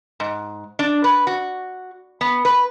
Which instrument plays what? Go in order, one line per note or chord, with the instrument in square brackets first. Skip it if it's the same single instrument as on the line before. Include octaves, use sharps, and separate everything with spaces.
[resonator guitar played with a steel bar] G#2
D4
B4
F#4
B3
B4